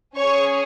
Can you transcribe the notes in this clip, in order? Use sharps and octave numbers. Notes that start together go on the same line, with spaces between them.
C#4 G#4 C#5 C#6